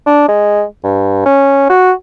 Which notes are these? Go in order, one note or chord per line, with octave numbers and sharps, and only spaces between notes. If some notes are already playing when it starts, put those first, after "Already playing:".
D4
G#3
G2
C#4
F#4